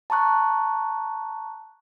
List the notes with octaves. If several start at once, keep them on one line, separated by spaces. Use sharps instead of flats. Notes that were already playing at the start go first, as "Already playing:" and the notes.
A5 A#5 C#6 F#6